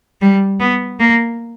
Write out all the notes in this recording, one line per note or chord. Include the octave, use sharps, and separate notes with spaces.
G3
B3
A#3